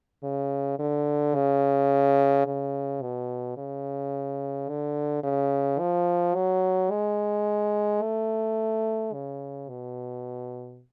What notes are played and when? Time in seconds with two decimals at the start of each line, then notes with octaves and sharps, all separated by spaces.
0.23 C#3
0.79 D3
1.35 C#3
2.46 C#3
3.02 B2
3.57 C#3
4.69 D3
5.24 C#3
5.80 F3
6.35 F#3
6.91 G#3
8.02 A3
9.14 C#3
9.69 B2